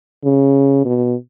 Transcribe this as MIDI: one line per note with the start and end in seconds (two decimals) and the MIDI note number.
0.25 0.81 49
0.85 1.15 47